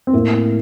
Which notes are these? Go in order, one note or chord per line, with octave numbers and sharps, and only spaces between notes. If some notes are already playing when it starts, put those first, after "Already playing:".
C4
A2 A#3